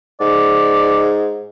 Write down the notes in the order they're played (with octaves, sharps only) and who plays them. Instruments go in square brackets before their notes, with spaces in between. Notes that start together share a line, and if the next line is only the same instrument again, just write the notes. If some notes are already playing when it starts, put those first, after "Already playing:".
[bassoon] G#2 [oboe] D5